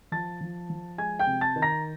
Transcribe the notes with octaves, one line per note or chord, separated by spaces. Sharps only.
F3 A5 A6
F3
F3
G#3 G#5 G#6
G5 G6
C3
A5 A6
D#3
A#5 A#6